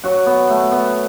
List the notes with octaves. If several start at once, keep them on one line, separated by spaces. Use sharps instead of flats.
F#3 F#4
B3
A3
B3